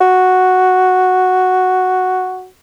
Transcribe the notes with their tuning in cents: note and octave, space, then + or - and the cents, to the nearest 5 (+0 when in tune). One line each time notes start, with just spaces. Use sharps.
F#4 +0